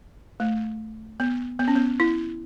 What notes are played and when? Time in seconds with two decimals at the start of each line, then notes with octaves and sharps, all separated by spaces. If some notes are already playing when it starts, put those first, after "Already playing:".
0.40 A3
1.20 B3
1.59 B3
1.68 C#4
1.76 B3
2.00 E4